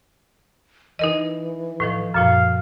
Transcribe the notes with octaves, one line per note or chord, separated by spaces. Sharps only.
E3 D#4 A#4 D#5
A2 D#3 F3
F#2 A#2 F3 F5